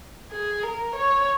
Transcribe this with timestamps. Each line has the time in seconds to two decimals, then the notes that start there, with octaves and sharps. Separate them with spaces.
0.31 G#4
0.63 A#4
0.96 C#5